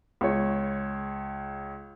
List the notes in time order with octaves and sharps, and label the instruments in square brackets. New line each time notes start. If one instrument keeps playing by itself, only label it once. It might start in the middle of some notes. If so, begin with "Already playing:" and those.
[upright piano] C#2 C#5